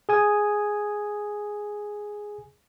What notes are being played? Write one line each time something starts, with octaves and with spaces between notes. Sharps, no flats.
G#4 G#5 D#6